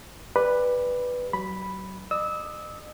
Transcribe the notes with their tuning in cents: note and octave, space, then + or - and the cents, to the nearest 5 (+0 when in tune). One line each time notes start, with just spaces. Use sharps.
G4 +40 B4 +0 D5 +10
F#3 +35 B5 +0
D#5 -40 E6 -25